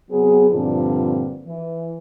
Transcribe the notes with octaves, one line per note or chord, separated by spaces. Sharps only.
C3 F#3 B3 C4 G#4
G2 A#2 D3 F3 C4 D4
E3